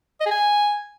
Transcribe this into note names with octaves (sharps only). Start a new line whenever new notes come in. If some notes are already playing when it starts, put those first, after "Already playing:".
D#5
G#4
G#5